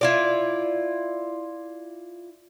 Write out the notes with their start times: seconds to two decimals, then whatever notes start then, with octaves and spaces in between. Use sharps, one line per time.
0.01 E4 F4 D5